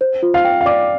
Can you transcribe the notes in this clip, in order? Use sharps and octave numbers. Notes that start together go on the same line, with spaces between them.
C5
F4
F5
G5
F5
D5 D6